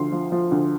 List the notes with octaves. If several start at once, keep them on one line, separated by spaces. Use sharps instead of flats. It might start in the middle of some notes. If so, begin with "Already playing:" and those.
Already playing: D2 F3 C6
F3
F3
D2